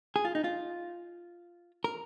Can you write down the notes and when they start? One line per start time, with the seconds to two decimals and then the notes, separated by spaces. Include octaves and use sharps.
0.16 G#4
0.25 F4
0.35 D#4
0.44 F4
1.84 A#4